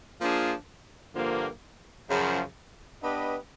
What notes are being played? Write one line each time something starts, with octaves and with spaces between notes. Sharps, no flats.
F3 A#3 D4 F4 G#4
G2 D3 F3 A#3
F#2 C#3 F3
B3 D4 G4 B4 D#5